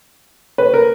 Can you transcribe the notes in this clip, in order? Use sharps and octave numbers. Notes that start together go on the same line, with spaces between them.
B4
A#4